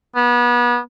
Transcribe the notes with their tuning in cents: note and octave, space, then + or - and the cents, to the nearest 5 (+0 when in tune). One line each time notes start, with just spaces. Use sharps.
B3 -30